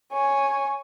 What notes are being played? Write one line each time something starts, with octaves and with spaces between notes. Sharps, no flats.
C#5 G#5